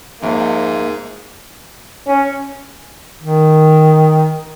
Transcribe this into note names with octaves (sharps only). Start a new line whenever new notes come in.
F2 G#2 A#3 E5
C#4
D#3